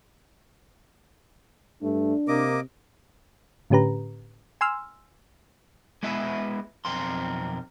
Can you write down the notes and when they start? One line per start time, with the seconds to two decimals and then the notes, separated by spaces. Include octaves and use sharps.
1.83 G2 A3 D4
2.28 C3 A#3 A#4 D#5 D6
3.70 A2 D3 C#4 G4 B4 A#5
4.61 G#5 C6 E6 F6
6.03 G#3 B3 E4 B4 E5
6.85 B1 F2 C4 A#4 C6